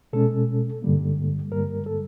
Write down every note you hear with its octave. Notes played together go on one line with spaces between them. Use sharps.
B2 G#3 C#4 A4
G2 D3 G3 A#3
G2 D3 G3 A#3 A#4
A4